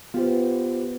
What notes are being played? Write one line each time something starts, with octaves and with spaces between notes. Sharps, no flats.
B3 F4 G4 C5